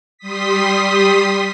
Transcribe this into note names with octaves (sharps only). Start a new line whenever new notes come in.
G3 C6 D#6 B6